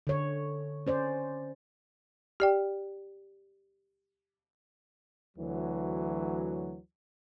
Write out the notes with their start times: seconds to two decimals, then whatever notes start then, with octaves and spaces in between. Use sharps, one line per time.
0.07 D3 C#5
0.87 C#4 C5 D5
2.40 G4 D5 G5
5.37 D2 E3 F#3